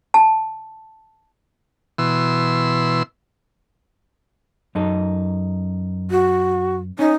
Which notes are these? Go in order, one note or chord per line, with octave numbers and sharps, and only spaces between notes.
A5
B2 E3 C6 E6
F#2 D#4 A4
F#4
C#4 D#4